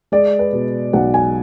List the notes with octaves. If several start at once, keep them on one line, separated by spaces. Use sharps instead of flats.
G#3 D5
B4
B2
B1 F#5
G#5